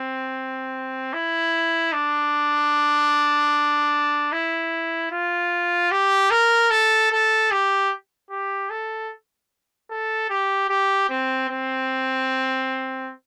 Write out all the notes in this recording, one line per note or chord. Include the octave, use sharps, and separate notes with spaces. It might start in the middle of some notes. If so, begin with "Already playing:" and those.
Already playing: C4
E4
D4
E4
F4
G4
A#4
A4
A4
G4
G4
A4
A4
G4
G4
C4
C4